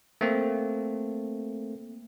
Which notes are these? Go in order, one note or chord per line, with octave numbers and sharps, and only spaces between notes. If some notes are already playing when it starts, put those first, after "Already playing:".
A3 A#3 C4